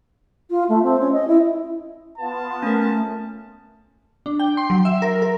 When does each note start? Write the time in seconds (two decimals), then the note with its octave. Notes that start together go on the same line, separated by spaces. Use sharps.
0.50 F4
0.68 A3
0.82 C4
0.99 C#4
1.12 D#5
1.27 E4
2.18 B3 F4 A5
2.63 A3 C#4 A#4
4.26 D4
4.40 G5
4.57 C6
4.70 F#3
4.85 E5
5.02 A#4
5.22 A#4